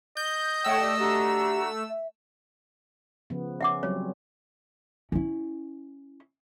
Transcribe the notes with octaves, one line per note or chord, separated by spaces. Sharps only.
D#5 G6
A3 C#5 F#5 G5 E6
G4 D5
D4 F#4 G4 A#5
E5
C#3 F3 B3
C#4 E5 F#5 D6
F#3 G3 C4 C#5
C#4 E4